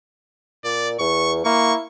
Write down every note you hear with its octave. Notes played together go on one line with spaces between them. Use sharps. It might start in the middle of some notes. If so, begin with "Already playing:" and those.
A#2 D5
E2 C#6
A#3 E4 C#6